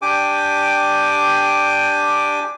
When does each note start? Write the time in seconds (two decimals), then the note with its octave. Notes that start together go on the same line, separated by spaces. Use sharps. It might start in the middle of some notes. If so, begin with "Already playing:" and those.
0.02 D4 G4 G5 G#5 D6